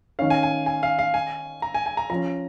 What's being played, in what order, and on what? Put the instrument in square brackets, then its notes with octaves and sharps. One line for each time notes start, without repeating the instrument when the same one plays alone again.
[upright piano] D#3 C#4 [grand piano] F5
[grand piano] G#5
G#5
G#5
F5
F5
G#5
A#5
G#5
G#5
A#5
[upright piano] F3 C#4 [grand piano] A#5